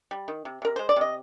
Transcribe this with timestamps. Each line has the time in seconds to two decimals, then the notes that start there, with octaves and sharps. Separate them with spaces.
0.11 G3
0.28 D#3
0.45 C3
0.62 C3 A#4
0.76 G#3 C5
0.89 D5
0.96 C3 D#5